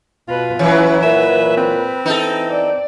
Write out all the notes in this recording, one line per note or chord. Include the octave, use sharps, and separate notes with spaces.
B2 F4 B4
E3 F#3 C#4 E4 B4
A#2 B4 E5
C4
E3 D#4 A4
D5